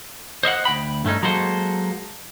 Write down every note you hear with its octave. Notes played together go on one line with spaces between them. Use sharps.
C5 D#5 E5 F#5
D2 G5 B5
G2 A3 C#4 D#4
F#3 G#3 A#3 A4 C5